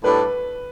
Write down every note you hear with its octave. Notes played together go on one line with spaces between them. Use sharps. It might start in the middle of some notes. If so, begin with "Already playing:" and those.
A2 G3 D4 A4 B4